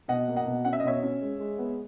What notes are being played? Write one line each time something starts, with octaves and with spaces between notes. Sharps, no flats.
B2 D#5 F#5
A#3
D#5 F#5
B2
C#4 F#5
E5
D#5
B2 C#5 E5
C#4
G#3
G#3
B3